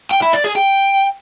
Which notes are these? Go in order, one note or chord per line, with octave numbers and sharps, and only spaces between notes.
G5
E4
D5
G#4
G5